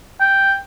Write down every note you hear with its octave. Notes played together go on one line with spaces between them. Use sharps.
G5